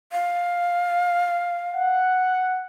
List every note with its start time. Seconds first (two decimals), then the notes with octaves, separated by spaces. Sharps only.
0.12 F5
1.73 F#5